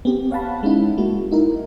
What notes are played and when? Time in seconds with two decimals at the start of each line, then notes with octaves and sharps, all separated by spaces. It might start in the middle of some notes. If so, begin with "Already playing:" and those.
0.05 B3 C4 G4
0.31 C#5 F5 F#5 A5 B5
0.63 G#3 C#4 D#4 E4
0.97 G#3 A#3 F#4
1.31 D#4 E4 A#4